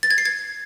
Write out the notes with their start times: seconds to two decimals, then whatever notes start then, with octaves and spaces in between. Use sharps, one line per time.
0.03 A6
0.11 G#6
0.18 C7
0.25 G#6